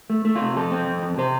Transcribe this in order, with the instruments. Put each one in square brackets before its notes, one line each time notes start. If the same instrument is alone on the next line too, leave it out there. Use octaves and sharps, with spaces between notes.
[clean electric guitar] A3
A3
F4
C3
F2 A4
C4
F2
F2
C3 C5